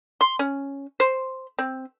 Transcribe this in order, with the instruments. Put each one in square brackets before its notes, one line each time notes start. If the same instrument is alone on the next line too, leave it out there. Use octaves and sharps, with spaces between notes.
[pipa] C6
C#4
C5
C4